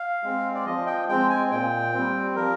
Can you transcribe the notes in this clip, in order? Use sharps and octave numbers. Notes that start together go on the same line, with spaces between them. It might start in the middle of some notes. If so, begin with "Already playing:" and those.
Already playing: F5
G#3 C4
D5
F3 D#5
G5
G#3 C4 G5
G#5
A#2 G5
G3 C4
F3 A#4